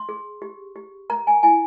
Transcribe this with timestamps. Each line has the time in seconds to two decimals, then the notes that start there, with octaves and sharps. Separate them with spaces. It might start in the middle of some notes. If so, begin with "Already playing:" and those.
Already playing: C6
0.09 G#4
0.42 G4
0.76 G4
1.10 A#4 A#5
1.27 G#5
1.43 E4 G#5